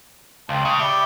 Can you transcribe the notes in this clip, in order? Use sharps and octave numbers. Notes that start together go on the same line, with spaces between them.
C#2 F5 G5 A5
C#3
G4 D5 E5 B5